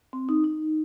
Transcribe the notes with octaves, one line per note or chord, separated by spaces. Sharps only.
C4
D#4
D#4